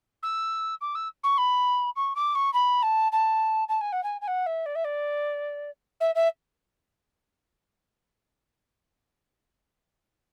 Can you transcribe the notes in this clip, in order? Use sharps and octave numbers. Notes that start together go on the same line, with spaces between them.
E6
D6
E6
C#6
B5
C#6
D6
C#6
B5
A5
A5
A5
G#5
F#5
G#5
G#5
F#5
E5
D5
E5
D5
E5
E5